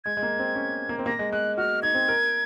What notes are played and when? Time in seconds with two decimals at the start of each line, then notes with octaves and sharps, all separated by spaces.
0.04 G#3 G#6
0.17 G#3
0.23 A#3
0.39 C4
0.55 C#4
0.89 A#3
0.99 C4
1.06 A#3 A#6
1.19 G#3
1.32 G#3 F#6
1.57 F#4 F6
1.82 D#4 G#6
1.95 C4
2.08 A#4